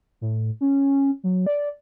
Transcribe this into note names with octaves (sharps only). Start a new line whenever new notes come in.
A2
C#4
F#3
D5